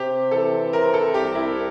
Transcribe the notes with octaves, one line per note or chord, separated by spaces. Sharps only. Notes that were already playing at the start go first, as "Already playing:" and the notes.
Already playing: C3 G4
E3 A4
C3 A#4
A4
C2 G4
E4